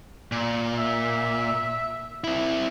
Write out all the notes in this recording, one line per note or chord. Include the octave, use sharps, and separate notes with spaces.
A#2
E5
C4 E4